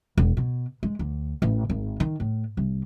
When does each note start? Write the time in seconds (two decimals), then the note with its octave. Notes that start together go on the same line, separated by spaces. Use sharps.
0.18 E1
0.37 B2
0.83 G#3
0.99 D2
1.42 A1
1.70 G#1
2.00 D#3
2.20 A2
2.57 C2